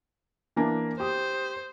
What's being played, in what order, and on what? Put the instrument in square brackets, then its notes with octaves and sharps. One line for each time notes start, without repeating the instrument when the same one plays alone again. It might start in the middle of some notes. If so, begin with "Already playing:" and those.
[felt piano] E3 A#3 D4
[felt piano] G4 D#6 [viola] C5